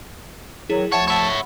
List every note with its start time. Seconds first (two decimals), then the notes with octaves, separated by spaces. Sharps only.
0.70 D#3 F#3 E4 G#4
0.92 D2 F3 C#5 E5 F#5 A5
1.08 C#5 E5 F#5 B5